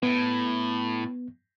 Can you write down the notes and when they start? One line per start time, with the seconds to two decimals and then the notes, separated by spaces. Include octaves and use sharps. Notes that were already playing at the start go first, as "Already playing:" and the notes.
0.03 A2 B3